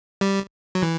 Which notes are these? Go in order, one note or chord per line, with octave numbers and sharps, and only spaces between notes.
G3
F#3
E3